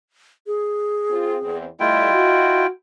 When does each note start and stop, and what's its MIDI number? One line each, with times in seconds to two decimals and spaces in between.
0.47 1.56 68
1.10 1.37 60
1.10 1.37 65
1.42 1.66 40
1.42 1.66 60
1.80 2.09 55
1.80 2.09 57
1.80 2.67 64
1.80 2.67 65
1.80 2.63 75
1.80 2.67 79
2.13 2.69 66